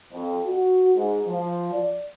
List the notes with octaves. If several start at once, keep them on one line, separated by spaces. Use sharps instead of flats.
F2
F#4
G#2
F3
D5